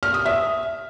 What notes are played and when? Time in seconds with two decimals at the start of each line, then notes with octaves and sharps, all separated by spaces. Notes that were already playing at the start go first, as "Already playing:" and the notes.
0.03 F6
0.14 D#6
0.25 E5